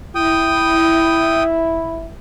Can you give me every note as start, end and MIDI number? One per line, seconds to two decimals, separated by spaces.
0.15 2.11 64
0.15 1.43 79
0.15 1.43 87